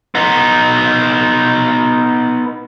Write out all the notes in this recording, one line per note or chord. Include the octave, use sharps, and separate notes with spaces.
B3 D#4